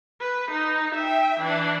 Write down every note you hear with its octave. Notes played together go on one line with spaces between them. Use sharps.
B4
D#4
E5 G5
E3 D4